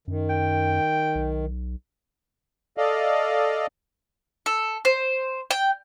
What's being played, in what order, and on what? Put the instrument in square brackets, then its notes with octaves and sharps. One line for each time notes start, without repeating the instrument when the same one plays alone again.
[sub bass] F#2 [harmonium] D#3
[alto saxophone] G5
[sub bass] B1
[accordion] A4 D5 D#5 F5
[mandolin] A4
C5
G5